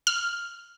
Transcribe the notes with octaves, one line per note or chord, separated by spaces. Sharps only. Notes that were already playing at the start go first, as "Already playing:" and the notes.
F6